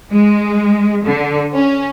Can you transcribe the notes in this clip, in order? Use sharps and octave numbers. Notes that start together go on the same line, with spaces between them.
G#3
D3
C#4